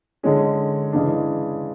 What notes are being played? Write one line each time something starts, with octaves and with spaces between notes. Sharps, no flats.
D3 G#3 C#4 G#4
C#3 E3 G#3 D4